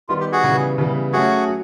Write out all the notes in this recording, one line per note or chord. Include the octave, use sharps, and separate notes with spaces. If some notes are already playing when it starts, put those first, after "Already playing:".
D#3 G3 B3 F4
G4
F#4 G#4
C#3 E3 G3 B3
C#3 E3 G3 B3
F#3 A3 C#4 F#4 G#4
F#3